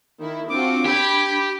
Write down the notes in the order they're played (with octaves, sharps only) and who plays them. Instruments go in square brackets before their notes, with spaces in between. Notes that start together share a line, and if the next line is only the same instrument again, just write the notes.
[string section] D#3 E4
[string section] C4 F4 F#4 [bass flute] D4 [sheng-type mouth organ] D6
[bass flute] D4 [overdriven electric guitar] G4 [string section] B5 G6 G#6